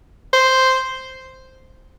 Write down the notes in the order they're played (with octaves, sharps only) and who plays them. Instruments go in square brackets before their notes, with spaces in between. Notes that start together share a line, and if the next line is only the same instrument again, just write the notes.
[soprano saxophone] C5